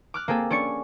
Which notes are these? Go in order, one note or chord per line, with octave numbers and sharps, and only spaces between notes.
D6 F6 F#6
A#3 C4 G#4 A4
C#4 D4 D5 C#6 C#7